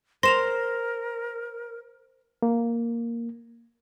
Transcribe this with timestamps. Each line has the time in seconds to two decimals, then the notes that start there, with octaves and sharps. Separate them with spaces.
0.23 A#4 C5 C6 A#6 E7 F7
2.42 A#3